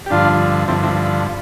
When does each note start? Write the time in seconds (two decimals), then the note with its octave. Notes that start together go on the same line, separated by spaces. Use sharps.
0.06 G4
0.10 G2 D3 F3 D4 F4
0.68 G2 D3 F3 C4 E4
0.83 C4 E4